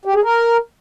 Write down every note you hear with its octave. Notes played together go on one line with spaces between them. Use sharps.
G4
G#4
A#4